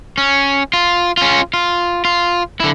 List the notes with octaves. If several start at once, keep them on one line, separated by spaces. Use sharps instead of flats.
C#4
F4
C#4 F4
F4
F4
D3 E4